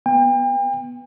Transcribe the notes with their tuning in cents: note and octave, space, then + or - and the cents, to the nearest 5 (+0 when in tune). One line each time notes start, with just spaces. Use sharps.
B3 +0 G5 +40